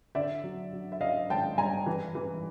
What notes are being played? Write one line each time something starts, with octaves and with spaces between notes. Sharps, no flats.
D3 D5 E5
F#3
F#3
E5
F#3 D#5 F5
G#1 G5 A5
G2 G#5 A#5
E3
E3